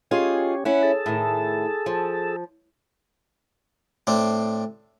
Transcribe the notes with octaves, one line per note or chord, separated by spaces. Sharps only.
C#4 F4 G4 G#4 C#5 D#5
C#4 E4 F#5
G#4 A4 A5
A2 D#3
F3
A2 C4 D4